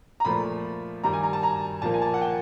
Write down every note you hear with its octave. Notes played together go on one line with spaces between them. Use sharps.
A#5
A#2 F3 A3 B5
G2 D#3 G3 A#5
G#5
A#5
A5
A#5
A#2 F3 A#3 A5
G#5
A5
F#5
G5